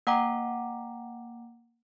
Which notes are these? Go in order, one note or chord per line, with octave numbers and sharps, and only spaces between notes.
A#3 F#5 G5 A#5 D6